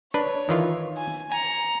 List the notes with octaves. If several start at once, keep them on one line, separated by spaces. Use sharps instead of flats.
D4 B4 C#5
D#3 E3 F4
G#5
G#5 A#5 C#7